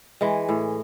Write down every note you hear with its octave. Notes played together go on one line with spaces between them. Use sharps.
E3 G#3
A2